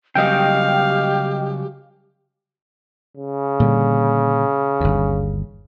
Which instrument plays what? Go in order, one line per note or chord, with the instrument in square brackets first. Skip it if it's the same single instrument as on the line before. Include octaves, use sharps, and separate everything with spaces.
[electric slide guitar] C#3 F#3 G3 [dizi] G4 [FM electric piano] D#5 G5 [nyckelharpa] F5
[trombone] C#3
[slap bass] A#2 D3 G3
G1 D#2